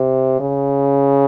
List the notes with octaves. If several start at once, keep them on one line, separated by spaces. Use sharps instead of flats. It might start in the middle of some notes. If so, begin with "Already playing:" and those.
Already playing: C3
C#3